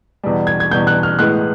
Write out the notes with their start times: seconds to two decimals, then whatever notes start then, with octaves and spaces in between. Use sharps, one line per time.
0.24 E2 B2 G3
0.47 G#6
0.60 G#6
0.71 E2 B2 G3 G6
0.87 F#6
1.03 F6
1.19 A2 E3 G#3 B3 F#6